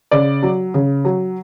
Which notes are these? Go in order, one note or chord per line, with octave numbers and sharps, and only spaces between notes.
C#3 D5
F#3
C#3
F#3